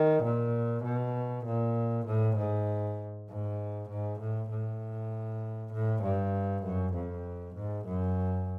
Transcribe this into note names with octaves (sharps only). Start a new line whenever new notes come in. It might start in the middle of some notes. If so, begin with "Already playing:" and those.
Already playing: D#3
A#2
B2
A#2
A2
G#2
G#2
G#2
A2
A2
A2
G2
F#2
F2
G#2
F#2